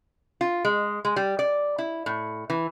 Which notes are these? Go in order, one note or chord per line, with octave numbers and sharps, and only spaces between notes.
F4
G#3
G#3
G3
D5
E4
A2
E3